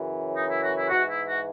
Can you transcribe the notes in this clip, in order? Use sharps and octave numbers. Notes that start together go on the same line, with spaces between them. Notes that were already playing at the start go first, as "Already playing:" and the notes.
Already playing: F#2 C#3 E3
D#4
E4
F#4
E4
G#2 E3 F#4
E4
F#4